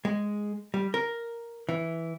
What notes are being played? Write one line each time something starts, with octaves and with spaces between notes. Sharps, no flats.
G#3
G3
A#4
E3